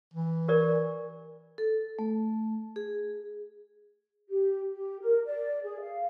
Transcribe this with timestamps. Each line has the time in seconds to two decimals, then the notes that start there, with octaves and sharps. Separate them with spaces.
0.14 E3
0.48 G4 A#4 D5
1.58 A4
1.99 A3
2.76 G#4
4.30 G4
4.71 G4
5.02 A#4
5.26 D5
5.64 G#4
5.81 F5